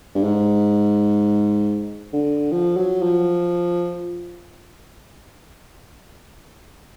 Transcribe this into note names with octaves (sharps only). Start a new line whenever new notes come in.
G2
G#2
D3
F3
F#3
F3